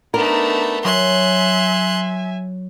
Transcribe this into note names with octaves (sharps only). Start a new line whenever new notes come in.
A3 B3 D4 D#4 A#4
F#3 E5 G#5 C6 F#6